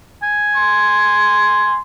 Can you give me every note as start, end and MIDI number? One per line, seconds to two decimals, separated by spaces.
0.23 1.77 80
0.55 1.80 84